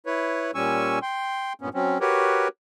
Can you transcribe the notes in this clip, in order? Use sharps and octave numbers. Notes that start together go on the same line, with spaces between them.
E4 B4 C#5
A#2 G3 C#4 G#5 C#6 E6
G5 C6
G2 A#2 B3 C#4
F#3 C4 C#4
F#4 G4 A#4 B4 C#5